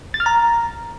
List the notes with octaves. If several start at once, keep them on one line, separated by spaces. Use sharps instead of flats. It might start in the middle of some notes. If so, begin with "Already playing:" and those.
A6
F6
A#5